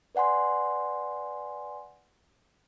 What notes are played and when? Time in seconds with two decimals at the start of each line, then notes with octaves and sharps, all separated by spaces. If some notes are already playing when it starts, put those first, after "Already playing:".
0.15 B4 D5 F#5 G#5 C6